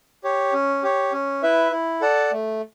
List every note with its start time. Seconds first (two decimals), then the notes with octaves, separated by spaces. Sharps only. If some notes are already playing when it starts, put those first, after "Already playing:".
0.24 G4 C#5
0.53 C#4
0.83 G4 C#5
1.12 C#4
1.43 E4 B4 E5
1.72 E4
2.01 A4 D5 F#5 A5
2.32 A3